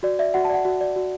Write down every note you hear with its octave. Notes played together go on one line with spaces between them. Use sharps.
F#4 D5
D5 E5
F#4 F#5
A5
D5 F#5
F#4
D5
F#4